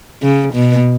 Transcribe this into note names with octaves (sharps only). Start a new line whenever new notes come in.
C#3
B2